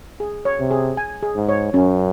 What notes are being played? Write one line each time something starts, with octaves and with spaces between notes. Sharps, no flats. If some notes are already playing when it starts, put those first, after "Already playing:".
G#4
C#5
C3
G#4
G#5
G#4
G#2
C#5
F#2 C#4